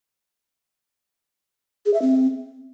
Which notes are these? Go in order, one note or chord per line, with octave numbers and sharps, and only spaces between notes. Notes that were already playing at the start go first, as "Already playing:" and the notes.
G#4
E5
C4